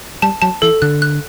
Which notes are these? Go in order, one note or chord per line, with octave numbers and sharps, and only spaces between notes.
G3 A5
F#3 A5
E3 A4
D3 F#6
F#6